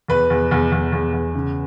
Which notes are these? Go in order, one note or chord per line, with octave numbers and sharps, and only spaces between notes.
E2 B4
E2
E2
E2
E2
E2
C#3